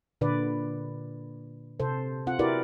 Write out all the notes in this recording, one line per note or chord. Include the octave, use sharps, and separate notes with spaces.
A#2 D3 B4 D5
C3 A4 C5
C4 F4 F#5
E4 F#4 G4 A#4 B4 D5